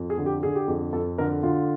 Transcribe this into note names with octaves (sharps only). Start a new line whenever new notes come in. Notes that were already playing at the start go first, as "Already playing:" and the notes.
Already playing: F2
G#4
D3
G4
D3 G#4
G4
F2 G#4
F2 A4
D3 A#4
D3 F4